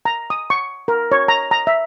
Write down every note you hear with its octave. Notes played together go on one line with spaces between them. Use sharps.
A#5
D#6
C#6
A#4
C#5
A#5
A#5
E5